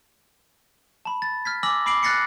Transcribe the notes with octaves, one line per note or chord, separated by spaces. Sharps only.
A5 B5
A6
F6 G#6 B6
G#5 D6 E6 A#6 F#7
B5 D6 C7 D7 F#7
F6 F#6 A6 A#6 C7 C#7